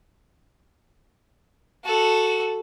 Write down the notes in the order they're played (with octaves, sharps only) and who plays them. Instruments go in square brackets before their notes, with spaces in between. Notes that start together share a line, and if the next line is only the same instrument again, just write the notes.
[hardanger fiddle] F#4 A4